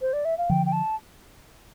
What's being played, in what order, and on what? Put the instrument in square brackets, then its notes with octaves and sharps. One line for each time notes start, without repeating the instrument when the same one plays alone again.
[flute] C5
D5
E5
F5
[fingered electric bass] D3 F3 [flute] G5
[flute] G5
A5